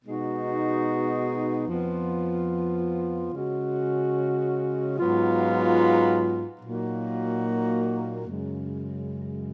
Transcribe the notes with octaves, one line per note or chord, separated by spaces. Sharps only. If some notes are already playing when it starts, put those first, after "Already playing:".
B2 G#3 B3 D#4 F#4
F2 F3 B3 F4
C#3 G#3 C#4 F#4
G#2 F#3 B3 F4
A#2 F#3 A#3 D#4 F#4
F#2 C#3 G#3